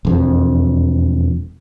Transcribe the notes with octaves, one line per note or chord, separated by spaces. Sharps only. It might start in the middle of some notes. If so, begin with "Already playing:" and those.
E1 F2